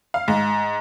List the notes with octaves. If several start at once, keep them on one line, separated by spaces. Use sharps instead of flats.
F5
G#2